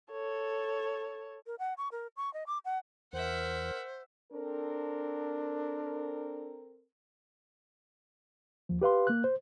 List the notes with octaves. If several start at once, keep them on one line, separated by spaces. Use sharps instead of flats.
A4 C#5
A#4
F#5
C#6
A#4
C#6
D#5
D6
F#5
E2 A#4 C5 E5 F#5
C4 D4 A4 A#4
D#2 F3
G4 B4 F5 C6
A#3 F#6
C5